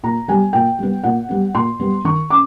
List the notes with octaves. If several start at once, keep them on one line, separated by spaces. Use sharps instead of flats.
A#2 A#5
G3 B3 G#5
A#2 G5
G3 B3
A#2 F#5
G3 B3
A#2 C6
G3 B3
D#3 C#6
C#4 D6